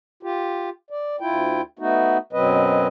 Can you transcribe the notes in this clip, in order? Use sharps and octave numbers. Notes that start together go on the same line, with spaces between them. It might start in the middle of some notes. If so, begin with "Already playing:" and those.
F4 G4
D5
D2 E4 F4 G5
A3 B3 D#4 F#4
F#2 B2 F#3 C4 B4 D#5